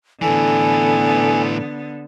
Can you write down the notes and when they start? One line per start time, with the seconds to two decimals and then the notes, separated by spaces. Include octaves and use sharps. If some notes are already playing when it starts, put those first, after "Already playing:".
0.22 A2 D3 E3 B3 A4 G#5